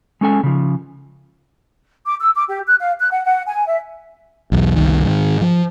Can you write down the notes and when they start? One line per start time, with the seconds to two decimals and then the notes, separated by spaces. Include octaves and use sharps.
0.21 G#3 C#4 A4 G#5
0.44 C#3 F3
2.06 D6
2.20 E6
2.35 D6
2.48 G4
2.67 F#6
2.80 F5
3.00 F#6
3.11 F#5
3.24 F#5
3.47 G#5
3.67 E5
4.52 B1 E2
4.76 F#1 C2 D#3
5.04 G#2 D#3
5.41 F3